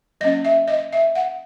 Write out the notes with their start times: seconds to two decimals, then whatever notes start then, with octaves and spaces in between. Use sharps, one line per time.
0.21 F#3 A#3 C#4 D#5
0.45 E5
0.68 D#5
0.93 E5
1.15 F#5